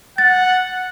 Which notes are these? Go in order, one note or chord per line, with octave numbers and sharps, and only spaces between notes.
F#5 A6